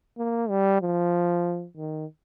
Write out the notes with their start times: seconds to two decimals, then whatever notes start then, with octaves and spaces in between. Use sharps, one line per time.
0.18 A#3
0.49 G3
0.81 F3
1.77 D#3